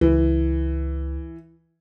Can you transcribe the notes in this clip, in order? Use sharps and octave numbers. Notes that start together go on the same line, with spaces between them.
C#2 E3